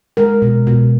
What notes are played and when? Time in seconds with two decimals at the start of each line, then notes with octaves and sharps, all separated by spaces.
0.17 G#3 A#4
0.42 B2
0.67 B2